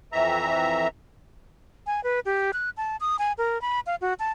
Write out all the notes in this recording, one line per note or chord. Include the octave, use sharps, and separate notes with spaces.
F2 E3 E5 A#5
G#5
B4
G4
F#6
A5
D#6
G#5
A#4
B5
F5
F#4
A5